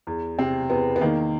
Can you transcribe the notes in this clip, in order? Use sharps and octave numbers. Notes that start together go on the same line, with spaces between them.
E2
C3 C4
E2 B3
B3
D#3 A#3